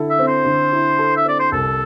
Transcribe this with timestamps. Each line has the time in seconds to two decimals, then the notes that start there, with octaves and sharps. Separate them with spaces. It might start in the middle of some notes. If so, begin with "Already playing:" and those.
Already playing: D3 E4 A4
0.10 E5
0.19 C4
0.27 C5
0.45 D3
0.72 E4
0.98 A4
1.17 E5
1.24 C4 D5
1.39 C5
1.52 C2 A4